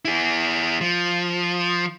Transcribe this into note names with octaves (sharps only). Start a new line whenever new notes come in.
E4 G#4
F3